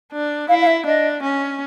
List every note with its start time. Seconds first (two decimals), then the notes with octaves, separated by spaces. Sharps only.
0.12 D4
0.49 E4 F5
0.61 F5
0.67 E5
0.86 D4 D#5
1.22 C#4